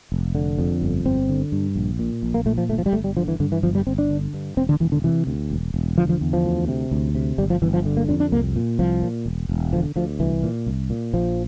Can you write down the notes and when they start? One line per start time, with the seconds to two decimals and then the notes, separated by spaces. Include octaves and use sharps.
0.12 F1
0.35 D3
0.59 F2
0.82 G1
1.05 G1 C4
1.29 D3
1.52 G2
1.76 A#1
1.99 A#2
2.23 A#1
2.34 A#3
2.46 A#2 A3
2.58 F3
2.69 G1 A3
2.78 F3
2.86 G3
2.92 G1 A3
3.04 G3
3.17 D3 F3
3.28 E3
3.40 G2 D3
3.52 E3
3.63 G1 F3
3.75 G3
3.87 G1 C4
3.98 D4
4.10 D3
4.34 G2
4.57 E1 C4
4.69 D3
4.80 E1 E3
4.92 D3
5.04 C3 E3
5.27 D2
5.51 E1
5.74 E1
5.98 D3 F3
6.09 F3
6.21 E2
6.33 F3
6.45 D2
6.68 C3
6.91 D2
7.15 C3
7.38 G1 G3
7.50 F3
7.62 G1 E3
7.74 F3
7.85 D3
7.97 A#3
8.09 F2 D4
8.20 D4
8.32 C2 A#3
8.56 A#2
8.79 C2 F3
9.02 A#2
9.26 E1
9.49 E1
9.73 D3 F3
9.96 D2 F3
10.20 C2 E3
10.43 A#2
10.67 C2
10.90 A#2
11.13 A#1 F3